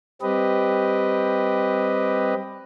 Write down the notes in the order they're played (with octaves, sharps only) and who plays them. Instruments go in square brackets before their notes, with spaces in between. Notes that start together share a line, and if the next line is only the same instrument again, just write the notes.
[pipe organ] G3 C4 G4 B4 D#5